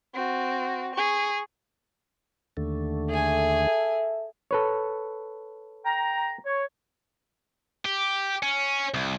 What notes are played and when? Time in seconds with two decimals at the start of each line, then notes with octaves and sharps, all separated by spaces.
0.14 C4 F#4
0.95 G#4 C#6
2.57 D#2 D3 A3
3.09 G#4 A4 E5 G#5
4.51 A4 B4 C#5
5.85 G5 A#5
6.46 C#5
7.85 G4
8.43 C#4
8.94 C2